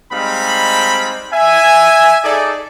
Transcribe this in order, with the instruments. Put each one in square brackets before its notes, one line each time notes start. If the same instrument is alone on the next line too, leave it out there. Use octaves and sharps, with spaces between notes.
[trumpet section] G3 G#3 C4 D#4 F5 B5
E5 G#5
D#4 G#4 A4 D5